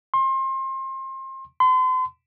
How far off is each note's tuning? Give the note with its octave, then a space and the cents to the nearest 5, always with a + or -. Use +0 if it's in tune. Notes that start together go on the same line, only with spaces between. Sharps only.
C6 +30
C6 -40